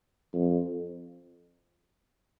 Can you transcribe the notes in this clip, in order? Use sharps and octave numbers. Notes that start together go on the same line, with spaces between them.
F2